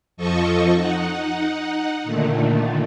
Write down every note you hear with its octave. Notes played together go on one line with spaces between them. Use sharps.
F2 F3 A4 D#5 C#6
D#4 F#5
A#2 D3 D#3 A3